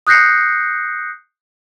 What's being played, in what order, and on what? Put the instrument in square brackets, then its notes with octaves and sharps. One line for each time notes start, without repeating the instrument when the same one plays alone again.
[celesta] D#6 F#6 G6 A#6 C7 C#7